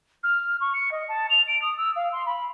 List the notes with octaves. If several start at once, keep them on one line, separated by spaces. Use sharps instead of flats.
F6
C#6
C#7
D#5
A5
F7
D7
D#6
E6
F5
C6
B5